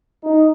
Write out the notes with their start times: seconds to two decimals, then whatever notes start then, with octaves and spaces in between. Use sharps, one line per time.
0.24 D#4